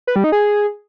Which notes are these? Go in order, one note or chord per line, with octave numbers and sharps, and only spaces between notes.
B4
G3
D#4
G#4